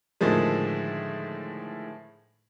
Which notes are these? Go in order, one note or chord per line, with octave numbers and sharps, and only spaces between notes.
A2 D3 D#3 F3 G#3